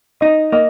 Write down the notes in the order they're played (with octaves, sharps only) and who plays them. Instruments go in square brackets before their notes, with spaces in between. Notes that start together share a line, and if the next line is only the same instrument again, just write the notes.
[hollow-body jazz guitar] D#4 [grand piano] D#5
[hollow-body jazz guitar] A#3 [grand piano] D#5